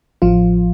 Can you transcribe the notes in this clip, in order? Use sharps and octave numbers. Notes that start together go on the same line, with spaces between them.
A1 F3 F4